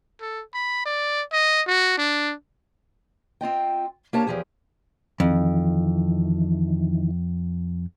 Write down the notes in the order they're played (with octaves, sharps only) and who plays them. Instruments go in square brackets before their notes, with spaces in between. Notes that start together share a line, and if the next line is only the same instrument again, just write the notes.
[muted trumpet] A4
B5
D5
D#5
F#4
D4
[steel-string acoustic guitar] C4 F4 D#5 G5
A#3 D4 G4 A#4 C#5 A5
E2 B2 F3 G4 G#4
[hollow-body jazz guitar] F2 [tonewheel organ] D#3 E3